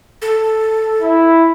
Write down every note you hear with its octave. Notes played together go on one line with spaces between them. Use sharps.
A4
E4